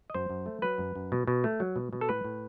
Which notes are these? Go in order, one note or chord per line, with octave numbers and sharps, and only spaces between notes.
D#5
F#2 C5
F#2
A3
F#3 B4
F#2
F#2
B2
B2
A3
F#3
B2
B2
A4
A2 B4
A2